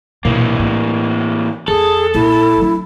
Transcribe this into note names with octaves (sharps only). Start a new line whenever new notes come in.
B1 A#2 E3 A#3
A2
F2 G#4 A4
A#1 E4
F#3 D4